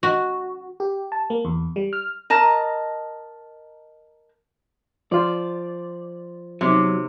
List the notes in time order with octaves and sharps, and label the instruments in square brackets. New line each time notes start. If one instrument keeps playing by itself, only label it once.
[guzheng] F#4
[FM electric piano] G4
A5
A#3
E2
G3
F6
[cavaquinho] A#4 D#5 A5 A#5
[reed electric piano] F3 F4 C5 [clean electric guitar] D5
[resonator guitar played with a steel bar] C3 [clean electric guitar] F#3 [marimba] B3 D#4